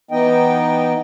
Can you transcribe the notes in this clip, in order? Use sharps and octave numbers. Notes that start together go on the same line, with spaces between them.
E3 B3 D#4 D#5 G5